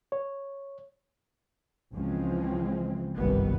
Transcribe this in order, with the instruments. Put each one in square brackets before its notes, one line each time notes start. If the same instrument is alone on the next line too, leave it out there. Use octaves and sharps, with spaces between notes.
[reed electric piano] C#5
[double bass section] C#2 C#3 E3 F3 G#3 C4
G1 C2 F#2 D#3 G3 B3